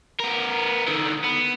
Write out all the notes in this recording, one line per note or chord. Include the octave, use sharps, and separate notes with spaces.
B3 A#4
D3 D#3
B3